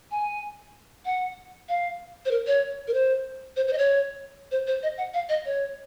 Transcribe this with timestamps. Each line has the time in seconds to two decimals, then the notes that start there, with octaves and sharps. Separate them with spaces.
0.11 G#5
1.05 F#5
1.69 F5
2.25 C5
2.31 A#4
2.47 C#5
2.88 A#4
2.94 C5
3.56 C5
3.68 C5
3.73 D#5
3.78 C#5
4.51 C5
4.67 C5
4.83 D#5
4.98 F#5
5.14 F5
5.29 D#5
5.46 C#5